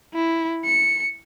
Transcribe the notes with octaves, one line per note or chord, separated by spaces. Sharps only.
E4
C#7